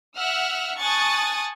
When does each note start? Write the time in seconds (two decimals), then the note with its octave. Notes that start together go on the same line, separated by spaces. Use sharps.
0.15 E5 F#5 E6 F6
0.79 G#5 A5 C#6 D#6 F#6 A6